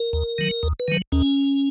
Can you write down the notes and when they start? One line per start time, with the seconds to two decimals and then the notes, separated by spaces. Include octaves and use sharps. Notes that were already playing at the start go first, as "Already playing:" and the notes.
Already playing: A#4
0.13 D#2
0.38 D#3 F#3
0.63 D#2
0.80 B4
0.88 D#3 F#3
1.12 D#2 C#4